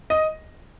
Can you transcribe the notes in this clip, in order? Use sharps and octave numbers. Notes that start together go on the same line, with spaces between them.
D#5